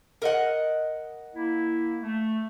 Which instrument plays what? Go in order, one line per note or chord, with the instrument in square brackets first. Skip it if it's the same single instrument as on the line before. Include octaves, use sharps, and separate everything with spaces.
[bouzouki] A#4 D#5 F#5
[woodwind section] A#3 E4
A3